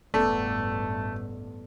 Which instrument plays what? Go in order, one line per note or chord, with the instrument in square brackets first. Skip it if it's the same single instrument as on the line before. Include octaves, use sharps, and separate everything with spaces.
[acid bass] E1 [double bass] A1 G2 [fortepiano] A3 [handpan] B3 A4 D5